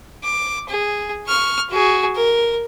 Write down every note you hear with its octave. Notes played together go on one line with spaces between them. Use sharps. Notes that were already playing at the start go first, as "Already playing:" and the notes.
D6
G#4
C#6 F6
F#4 G#4
A#4